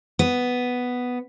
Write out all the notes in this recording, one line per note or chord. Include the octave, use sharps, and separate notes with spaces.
B3